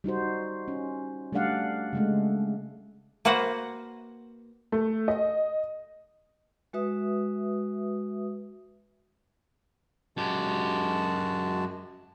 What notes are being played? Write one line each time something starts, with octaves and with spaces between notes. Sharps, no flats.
G3 D#4 F#4 C5
C#4
G3 A3 D4 D5 F5 F#5
C#3 G#3 A3
A#3 F#4 B4 C5 F#5
A3
D#5
G#3 F#4 B4 E5 D#6
F#2 G#3 F#4 G4 A5